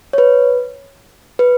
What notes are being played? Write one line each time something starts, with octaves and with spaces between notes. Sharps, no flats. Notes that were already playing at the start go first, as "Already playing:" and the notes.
C#5
B4
B4